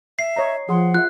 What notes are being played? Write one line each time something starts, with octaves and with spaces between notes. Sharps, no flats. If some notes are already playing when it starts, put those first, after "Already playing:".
E5 C7
C#5 D#5 A#5
F3 G#4 F#5 C6
F4 E5 F#6